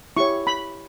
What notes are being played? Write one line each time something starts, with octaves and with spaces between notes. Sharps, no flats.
E4 G4 C#5 C#6
B5